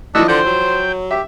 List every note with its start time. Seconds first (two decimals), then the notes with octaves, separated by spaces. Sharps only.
0.15 E3 F3 A3 D4 F#4 D#5 E6
0.28 D3 C5 G5
0.46 F#3
1.11 G4 E5